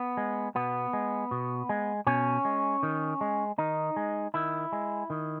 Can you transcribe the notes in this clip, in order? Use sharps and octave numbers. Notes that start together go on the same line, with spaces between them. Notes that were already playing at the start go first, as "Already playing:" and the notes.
Already playing: B3
G#3
B2 B3
G#3
B2
G#3
B2 C#4
G#3
D#3
G#3
D#3 D#4
G#3
D#3 E4
G#3
D#3